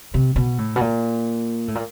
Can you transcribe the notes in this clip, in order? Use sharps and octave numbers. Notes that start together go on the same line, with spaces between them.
C3
B2
A2
B2
A#2
A2
A#2